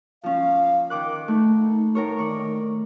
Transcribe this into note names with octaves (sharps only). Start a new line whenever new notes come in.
F3 C#4 F5
D#3 A#4 D6 F#6
A3 D#4
A2 A#4 C#5
D#3 D5 C#6